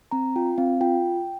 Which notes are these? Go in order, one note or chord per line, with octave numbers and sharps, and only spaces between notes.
C4 A#5
F4 G5
C4 F5
F4 G5